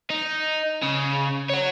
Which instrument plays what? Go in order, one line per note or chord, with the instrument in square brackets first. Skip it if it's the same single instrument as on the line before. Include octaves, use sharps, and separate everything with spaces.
[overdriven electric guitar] D#4
C#3
C#5 F#5